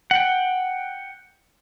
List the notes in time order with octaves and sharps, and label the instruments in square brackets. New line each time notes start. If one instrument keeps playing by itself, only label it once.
[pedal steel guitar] F#5 G5